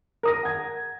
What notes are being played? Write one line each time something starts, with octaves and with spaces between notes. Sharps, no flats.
A#4 D#6 A#6
F#5 G#6